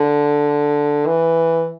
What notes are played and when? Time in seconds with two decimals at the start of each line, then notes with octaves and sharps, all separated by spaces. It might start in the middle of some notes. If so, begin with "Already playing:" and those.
Already playing: D3
1.06 E3